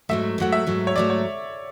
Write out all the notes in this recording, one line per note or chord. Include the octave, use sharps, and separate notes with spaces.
G#2 F#3 A3 E5
G#2 F#3 A3 F#5
E5
G#2 F#3 A3
C#5
G#2 F#3 A3 D5
C#5